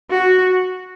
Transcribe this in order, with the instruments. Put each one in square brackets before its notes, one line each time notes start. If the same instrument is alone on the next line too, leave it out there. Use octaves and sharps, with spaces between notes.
[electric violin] F#4